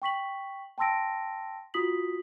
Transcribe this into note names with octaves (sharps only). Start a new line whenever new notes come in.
G5 C#6 B6 F#7
G5 A5 C6 E6 A#6 D7
F4 F#4 D#6 B6 F#7